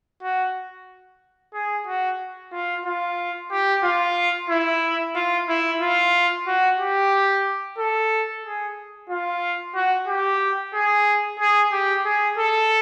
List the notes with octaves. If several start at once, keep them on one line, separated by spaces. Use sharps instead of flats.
F#4
G#4
F#4
F4
F4
G4
F4
E4
F4
E4
F4
F#4
G4
A4
G#4
F4
F#4
G4
G#4
G#4
G4
G#4
A4